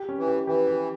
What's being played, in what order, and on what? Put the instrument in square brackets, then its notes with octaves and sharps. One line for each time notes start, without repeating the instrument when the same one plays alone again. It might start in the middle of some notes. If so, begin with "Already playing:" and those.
Already playing: [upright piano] G4
C#4
[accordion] E3
[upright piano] G4
[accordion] E3 [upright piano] G4
[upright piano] G4